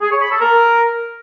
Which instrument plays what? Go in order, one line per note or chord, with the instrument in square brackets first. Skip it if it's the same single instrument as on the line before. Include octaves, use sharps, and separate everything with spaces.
[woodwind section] G#4
C#5
B5
A4
A#4